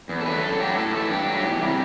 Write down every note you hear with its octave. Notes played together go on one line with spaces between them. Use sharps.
E2
A4
D3 F#3 A3 B4
F#2 A4
F#3 A3 G4
A2 A4
E3 A3 A4
G2 G4
F#3 A3
E2
C3 E3 G3